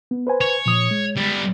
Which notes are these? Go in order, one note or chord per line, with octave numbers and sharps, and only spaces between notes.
B3
B4 C5 G#5
C#5
A#2 F3 D#6
G#3
G3 B3